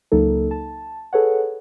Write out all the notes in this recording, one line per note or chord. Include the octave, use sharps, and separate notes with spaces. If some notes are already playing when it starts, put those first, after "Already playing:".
C#2 F#3 A#3 D#4 A4
A5
G#4 A4 B4 C#5 F#5